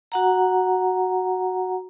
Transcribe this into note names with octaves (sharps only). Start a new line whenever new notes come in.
F#4 F#5 A#5